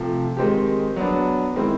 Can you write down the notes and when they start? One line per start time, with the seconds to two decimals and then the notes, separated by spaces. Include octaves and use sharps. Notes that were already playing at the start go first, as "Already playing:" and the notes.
Already playing: C3 F3 A3
0.37 D#3 G#3 C4 D#4 G4
0.96 F#3 B3 D4
1.56 D#3 G#3 C4 E4